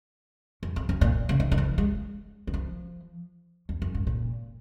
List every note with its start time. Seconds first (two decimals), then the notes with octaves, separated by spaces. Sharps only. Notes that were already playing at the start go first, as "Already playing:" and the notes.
0.63 F#2
0.76 F2
0.89 F#2
1.01 A#2
1.29 C#3
1.40 D#3
1.52 D#3
1.58 F3
1.78 G#3
2.47 D#3
2.54 F3
3.69 F2
3.82 F#2
3.95 G#2
4.07 A#2